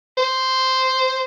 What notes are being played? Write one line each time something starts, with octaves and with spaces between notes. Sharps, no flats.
C5